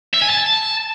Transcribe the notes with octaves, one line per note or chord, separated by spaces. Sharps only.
E5
G#5
A5